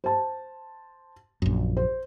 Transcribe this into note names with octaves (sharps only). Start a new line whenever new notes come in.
C5 A5
A#1 F#2
C5